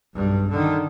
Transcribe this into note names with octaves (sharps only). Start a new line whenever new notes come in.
B1 G2
D3 D#3